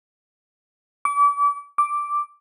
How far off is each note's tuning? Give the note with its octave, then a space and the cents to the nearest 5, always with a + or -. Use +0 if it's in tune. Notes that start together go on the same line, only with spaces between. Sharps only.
D6 -35
D6 +0